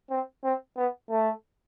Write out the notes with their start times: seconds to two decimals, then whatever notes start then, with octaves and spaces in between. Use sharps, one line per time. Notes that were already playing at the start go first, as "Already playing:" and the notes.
0.10 C4
0.44 C4
0.77 B3
1.10 A3